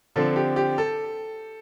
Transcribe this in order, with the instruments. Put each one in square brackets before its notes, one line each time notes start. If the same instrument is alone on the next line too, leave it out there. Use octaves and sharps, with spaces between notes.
[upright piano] D3 F3 C4 A4
G4
G4
A4